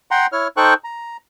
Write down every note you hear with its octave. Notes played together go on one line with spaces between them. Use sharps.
F#5 G5 A#5 C6
E4 C#5 F6
D#4 A4 C5 G5 C#6 F#6
A#5